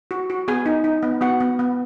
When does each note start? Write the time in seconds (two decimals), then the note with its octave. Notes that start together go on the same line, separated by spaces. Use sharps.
0.11 F#4
0.30 F#4
0.48 B3 G#4 G#5
0.66 D#4
0.84 D#4
1.03 B3
1.21 B3 F#4 F#5
1.40 B3
1.59 B3